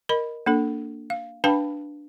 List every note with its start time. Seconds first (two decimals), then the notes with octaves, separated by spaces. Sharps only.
0.09 A#4 D#5 B5
0.46 A#3 D4 A4
1.10 F5
1.44 D4 B4 F5 G5 A5 B5